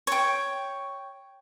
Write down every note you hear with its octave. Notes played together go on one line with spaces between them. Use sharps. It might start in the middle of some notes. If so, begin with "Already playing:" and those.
C#5 G5